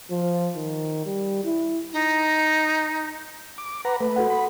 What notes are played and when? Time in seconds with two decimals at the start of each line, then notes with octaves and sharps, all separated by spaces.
0.11 F3
0.56 D#3
1.06 G3
1.44 E4
1.93 D#4
3.58 D6
3.85 B4 F#5 A#5
4.01 A3 B4
4.16 F#4 A4 F#5
4.30 B5